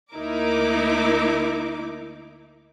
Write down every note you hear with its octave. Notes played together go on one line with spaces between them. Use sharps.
D2 A#3 D#4 E4 A#4 D6